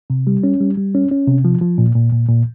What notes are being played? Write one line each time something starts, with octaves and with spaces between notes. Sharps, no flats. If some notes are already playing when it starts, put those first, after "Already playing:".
C3
G3
C#4
G3
G3
C#4
C#4
C3
F3
F3
A#2
A#2
A#2
A#2